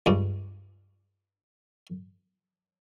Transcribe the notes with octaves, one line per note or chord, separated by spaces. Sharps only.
C#2 G2